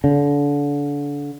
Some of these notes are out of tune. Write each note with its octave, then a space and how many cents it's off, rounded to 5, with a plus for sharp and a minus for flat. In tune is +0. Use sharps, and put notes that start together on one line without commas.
D3 -30